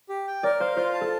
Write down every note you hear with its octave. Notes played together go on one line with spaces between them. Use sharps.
G4
G5
A#4 D5
C5 F5
F4 C5
A5
A4